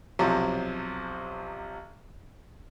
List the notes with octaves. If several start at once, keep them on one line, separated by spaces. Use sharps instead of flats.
B1 C3 F3 F#3